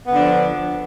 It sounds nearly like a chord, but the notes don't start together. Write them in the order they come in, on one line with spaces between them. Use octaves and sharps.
B3 D3 D4 F3